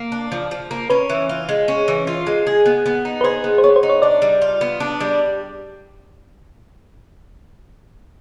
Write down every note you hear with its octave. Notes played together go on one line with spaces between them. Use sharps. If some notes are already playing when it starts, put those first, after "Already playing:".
Already playing: A#3
D4
F3
F3
A#3
C#4 B4
E3
F4
G#3
C#4
E3
F4
G#3
G#4
B3
B3
D#4
B4
G#4 C5
B3
C5
B3 C#5
C5
D#4
C#5
D4 D5
G3
F4
B3
D4
G3